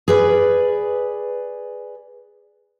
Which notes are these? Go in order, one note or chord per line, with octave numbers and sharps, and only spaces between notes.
G#4 B4 D5